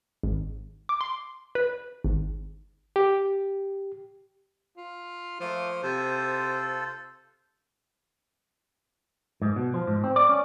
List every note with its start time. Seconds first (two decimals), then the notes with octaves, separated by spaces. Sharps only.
0.23 G#1
0.89 D6
1.01 C6
1.55 B4
2.04 G#1
2.96 G4
4.77 F4
5.40 F3 A3 A#3
5.83 C3 F4 A4 C5
9.42 G#2
9.56 B2
9.74 F3
9.87 G#2
10.04 C4
10.16 D5
10.29 C#4